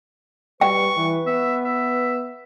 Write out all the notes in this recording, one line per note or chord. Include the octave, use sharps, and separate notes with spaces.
G3 B4 G5 C#6
E3
B3 E5
E5